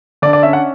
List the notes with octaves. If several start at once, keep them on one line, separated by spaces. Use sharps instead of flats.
D3 D5
D5
C#4 E5
F#5